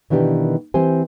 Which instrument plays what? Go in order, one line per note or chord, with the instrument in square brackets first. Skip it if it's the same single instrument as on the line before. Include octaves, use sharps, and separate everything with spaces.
[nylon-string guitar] B2 D#3 E3 D4 G4
E3 C4 G4 C5 G#5